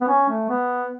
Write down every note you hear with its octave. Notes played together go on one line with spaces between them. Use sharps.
B3
C#4
A3
B3